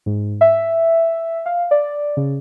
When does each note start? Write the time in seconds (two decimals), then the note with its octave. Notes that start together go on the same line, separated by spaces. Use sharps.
0.06 G#2
0.41 E5
1.46 F5
1.71 D5
2.17 C#3